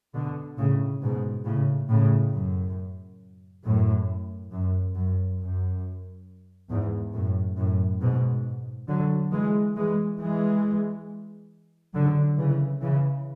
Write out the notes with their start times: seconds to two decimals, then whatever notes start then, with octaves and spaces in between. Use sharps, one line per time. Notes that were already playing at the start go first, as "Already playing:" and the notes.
0.14 B2 D3
0.58 A2 C#3
1.02 G#2 B2
1.45 A2 C#3
1.90 A2 C#3
2.33 F#2
3.64 F#2 A2
4.52 F#2
4.96 F#2
5.39 F#2
6.70 E2 G#2
7.14 F#2 A2
7.57 F#2 A2
8.01 G#2 B2
8.88 D3 F#3
9.32 E3 G#3
9.76 E3 G#3
10.20 E3 G#3
11.94 D3 F#3
12.38 C#3 E3
12.82 C#3 E3